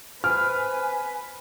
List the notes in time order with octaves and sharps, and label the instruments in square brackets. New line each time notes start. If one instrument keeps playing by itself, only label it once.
[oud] C4 [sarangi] B4 [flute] G#5 [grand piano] F6